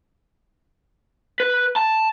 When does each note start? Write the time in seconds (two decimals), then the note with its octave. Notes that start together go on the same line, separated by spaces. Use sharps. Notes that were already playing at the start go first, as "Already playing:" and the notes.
1.40 B4
1.76 A5